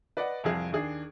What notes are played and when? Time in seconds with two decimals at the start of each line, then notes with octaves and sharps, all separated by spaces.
0.17 B4 D5 D#5 F#5
0.44 C2 F2 G#4 F5
0.72 D#2 D4 G#4